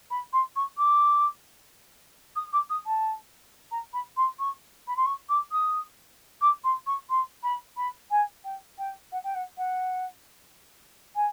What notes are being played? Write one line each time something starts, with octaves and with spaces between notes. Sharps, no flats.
B5
C6
C#6
D6
D#6
D6
D#6
A5
A#5
B5
C6
C#6
B5
C6
C#6
D6
D#6
D6
C6
C#6
C6
B5
B5
G#5
G5
G5
F#5
G5
F#5
F#5
G#5